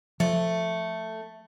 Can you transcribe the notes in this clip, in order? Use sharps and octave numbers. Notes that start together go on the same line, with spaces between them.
F3 A3